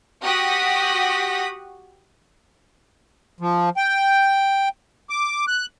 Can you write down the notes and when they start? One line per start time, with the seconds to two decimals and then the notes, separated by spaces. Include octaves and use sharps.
0.23 F#4 G4 F#5 D#6 A#6 B6
3.40 F3
3.77 G5
5.10 D6
5.48 F#6